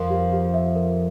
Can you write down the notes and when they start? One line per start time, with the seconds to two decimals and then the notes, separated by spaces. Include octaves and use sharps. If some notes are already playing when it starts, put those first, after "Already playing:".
Already playing: F2 F3 A#4
0.10 G4
0.32 G4
0.54 E5
0.76 A#4